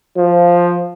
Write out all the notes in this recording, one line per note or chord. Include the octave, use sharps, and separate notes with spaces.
F3